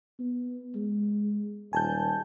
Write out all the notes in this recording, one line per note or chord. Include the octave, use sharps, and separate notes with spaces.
B3
G#3
D#1 G#5 A5 G6